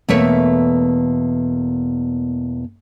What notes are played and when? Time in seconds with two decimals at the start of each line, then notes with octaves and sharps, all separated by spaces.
0.09 E2 B2 A3 A#3 C#5 E5